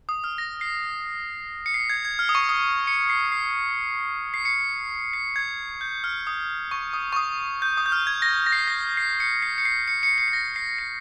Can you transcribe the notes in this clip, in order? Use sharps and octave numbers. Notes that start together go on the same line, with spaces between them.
D#6
F6
A#6
C7
C#7
C7
G#6
G#6
F6
D#6
C#6
D#6
C#7
C7
C7
C7
C#7
C7
G#6
G6
F6
D#6
C#6
D#6
C#6
D#6
G6
D#6
G6
F6
G#6
A#6
A#6
C7
A#6
C7
C#7
C7
C#7
C7
C#7
C#7
C#7
C7
A#6
C7
C#7